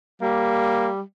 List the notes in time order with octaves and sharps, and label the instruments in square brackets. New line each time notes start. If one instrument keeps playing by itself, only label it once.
[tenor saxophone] G3 [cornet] A#3